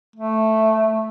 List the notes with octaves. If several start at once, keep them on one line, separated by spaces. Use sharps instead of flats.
A3